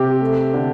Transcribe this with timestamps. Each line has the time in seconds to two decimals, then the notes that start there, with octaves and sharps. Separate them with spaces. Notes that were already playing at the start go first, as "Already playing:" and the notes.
Already playing: C3 G4
0.21 A3
0.54 D3